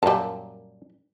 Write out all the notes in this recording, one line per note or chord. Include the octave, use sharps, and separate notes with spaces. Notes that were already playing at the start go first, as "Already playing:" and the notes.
F#2 A#2 G3 A5